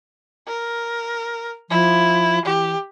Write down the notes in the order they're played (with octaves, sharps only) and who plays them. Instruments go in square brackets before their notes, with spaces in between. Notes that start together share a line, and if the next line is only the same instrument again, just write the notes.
[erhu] A#4
[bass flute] F3 [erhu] E4
[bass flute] E3 [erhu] G4